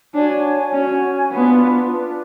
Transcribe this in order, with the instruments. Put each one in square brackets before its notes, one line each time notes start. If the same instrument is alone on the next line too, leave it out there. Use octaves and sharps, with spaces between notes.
[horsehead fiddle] D4 [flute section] F#4 C#5 G#5
[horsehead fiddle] C#4 [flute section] F#4 C#5 G#5
[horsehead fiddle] B3 [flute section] D4 F4 B4
[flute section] D4 F4 B4